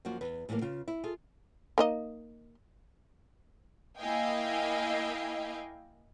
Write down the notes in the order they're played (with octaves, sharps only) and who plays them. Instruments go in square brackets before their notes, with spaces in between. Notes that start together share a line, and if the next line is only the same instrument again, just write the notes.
[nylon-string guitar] F#2 F3 A#3 F#4
E2 B4
A2 E3 F#3 G3 A#3
C#3 F4
E4
F4 G#4 A4
[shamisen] A#3 D#4 D#5
[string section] A#3 E4 D#5 F5 G5 G#5